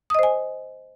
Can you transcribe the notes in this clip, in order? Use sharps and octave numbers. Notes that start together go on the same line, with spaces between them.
C5 D#5 G#5 D#6